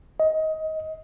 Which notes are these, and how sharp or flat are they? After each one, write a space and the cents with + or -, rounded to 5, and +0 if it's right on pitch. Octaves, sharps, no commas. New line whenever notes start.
D#5 +20